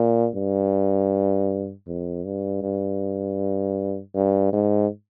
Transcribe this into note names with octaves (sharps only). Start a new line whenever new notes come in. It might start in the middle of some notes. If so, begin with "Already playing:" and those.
Already playing: A#2
G2
F2
G2
G2
G2
G#2